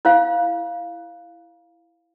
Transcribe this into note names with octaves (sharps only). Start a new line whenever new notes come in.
E4 C5 F5